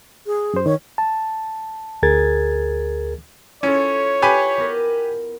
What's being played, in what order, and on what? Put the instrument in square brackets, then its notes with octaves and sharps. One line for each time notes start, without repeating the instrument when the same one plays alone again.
[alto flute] G#4
[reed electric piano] F#2 C5
[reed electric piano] D#3 [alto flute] C#5
[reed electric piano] A5
D2 G#4 A#4 G#6 A6
[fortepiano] C#4 [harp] E4 F4 A4 [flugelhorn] C#5
[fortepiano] G4 B4 G#5
[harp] B3 A#4